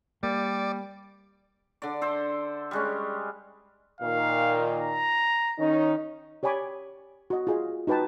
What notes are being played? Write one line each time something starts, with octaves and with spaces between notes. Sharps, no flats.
G3 A#3 D5
D3 D5
A4 C5 E5
G3 G#3 C#4
A#2 D#3 A#4 F5
A#5
D#3 C#4 D#4
G4 C#5 D5 G#5 B5 D6
F#4 D#5
F4 G#4 D#5
D#4 F#4 B4 G5 A5